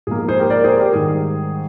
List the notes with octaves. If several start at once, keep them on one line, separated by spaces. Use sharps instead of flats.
G#2 F3 A#3 G#4
G#4 C5
G4 A#4
A#4 D5
G#4 C5
G4 A#4
G#2 D#3 G3 G#4